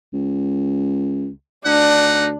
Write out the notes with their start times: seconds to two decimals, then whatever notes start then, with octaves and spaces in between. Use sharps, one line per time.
0.14 C#2
1.66 D2 D4 D#4 F#5